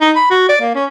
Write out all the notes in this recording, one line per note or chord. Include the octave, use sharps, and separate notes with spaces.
D#4
B5
F#4
D5
A#3
C#4